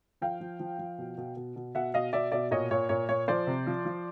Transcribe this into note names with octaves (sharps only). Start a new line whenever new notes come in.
F3 F5 G5
F3
F3
F3
B2
B2
B2
B2
B2 E5 F#5
B2 D#5 F5
B2 D5 E5
B2 D5 E5
A#2 C#5 D#5
A#2 C#5
A#2 C#5
A#2 C#5
F3 C5 D5
C3
F3
F3